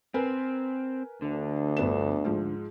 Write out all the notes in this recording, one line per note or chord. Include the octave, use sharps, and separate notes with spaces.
C4 A#4 B4 G#5
D2 D3
G1 B3 E7
G#2 F3